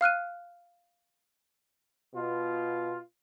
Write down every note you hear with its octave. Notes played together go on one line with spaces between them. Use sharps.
F5 F6 F#6 D#7
B2 F4